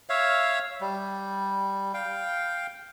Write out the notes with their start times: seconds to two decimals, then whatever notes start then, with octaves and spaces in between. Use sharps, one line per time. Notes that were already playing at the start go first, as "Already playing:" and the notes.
0.10 C#5 E5 F5
0.81 G3
1.94 F5 G5